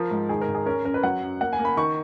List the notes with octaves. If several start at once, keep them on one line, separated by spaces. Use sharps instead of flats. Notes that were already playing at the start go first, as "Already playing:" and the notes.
Already playing: F3 A#4
G#2
D#3 G#4
A#4
G#1
G#4
C#4 A#4
F#2 A#4
B4
F#3 F#5
F#2
A#3 F#5
G#5
A#3
B5
D#3 C#6